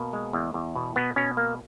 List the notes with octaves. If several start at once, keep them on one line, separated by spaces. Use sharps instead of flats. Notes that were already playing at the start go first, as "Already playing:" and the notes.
Already playing: B2 A#3
G#3
E2
E2
B2
B2 B3
B2 C#4
A#3